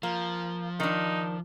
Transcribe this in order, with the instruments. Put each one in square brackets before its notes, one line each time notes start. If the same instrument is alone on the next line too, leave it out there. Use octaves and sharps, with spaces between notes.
[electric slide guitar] F3 [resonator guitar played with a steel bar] A#3
[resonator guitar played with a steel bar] D#3 D4 [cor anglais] D#4